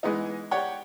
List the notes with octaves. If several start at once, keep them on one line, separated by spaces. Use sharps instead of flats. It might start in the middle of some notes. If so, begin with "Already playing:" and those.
E3 G#3 B3 D#4
G4 C#5 D5 F#5 G5